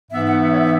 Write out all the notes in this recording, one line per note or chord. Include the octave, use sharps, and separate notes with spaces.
G#2 E3 B3 E5
F#5
E5
C#5
E5